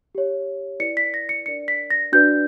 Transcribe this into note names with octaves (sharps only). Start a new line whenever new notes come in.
G4 C#5
E4 B4 D5 C#7
B6
A#6
C#7
D4 A#4 D5 C#7
B6
A#6
D4 F#4 B4 D5 G6